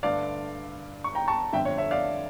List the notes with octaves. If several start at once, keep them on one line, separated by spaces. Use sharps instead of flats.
G2 D3 A3 D5 F5
C#6
G5 A#5
A5 C#6
G1 F2 D3 A3 E5 G5
C#5
C#5 E5
D5 F5